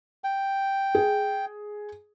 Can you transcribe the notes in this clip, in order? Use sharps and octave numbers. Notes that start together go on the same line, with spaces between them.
G5
G#4